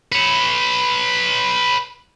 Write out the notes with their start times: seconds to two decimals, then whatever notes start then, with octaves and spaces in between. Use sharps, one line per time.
0.12 B4 C#5